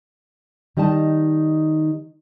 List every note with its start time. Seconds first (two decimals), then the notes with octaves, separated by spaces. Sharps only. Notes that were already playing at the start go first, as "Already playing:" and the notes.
0.77 D#3 G3 D#4 D#5 A5